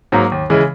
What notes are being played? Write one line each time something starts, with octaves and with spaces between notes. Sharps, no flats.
G#2 F#3 A#3
D#2
C#3 E3 G#3